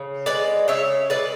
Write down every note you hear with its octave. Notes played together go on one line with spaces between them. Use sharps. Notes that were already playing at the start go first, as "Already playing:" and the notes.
Already playing: C#3
G#3 B4 D5
C#3 C#5 E5
G#3 B4 D5